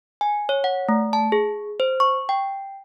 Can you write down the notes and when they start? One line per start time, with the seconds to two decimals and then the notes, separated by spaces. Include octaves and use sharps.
0.21 G#5
0.49 C#5
0.64 F#5
0.89 A3
1.13 A5
1.32 G#4
1.80 C5
2.00 C#6
2.29 G5